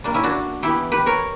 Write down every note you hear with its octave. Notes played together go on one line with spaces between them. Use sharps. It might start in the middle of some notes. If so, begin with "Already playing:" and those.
C#3 G3 A#3 D4
C#4 E4
D4 F#4
E3 B3 E4 G4
G4 B4
A#4 C#5